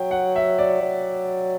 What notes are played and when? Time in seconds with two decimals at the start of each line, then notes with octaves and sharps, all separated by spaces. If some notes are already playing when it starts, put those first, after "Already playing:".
Already playing: F#3 G5
0.11 F#5
0.36 E5
0.58 D5
0.82 F#3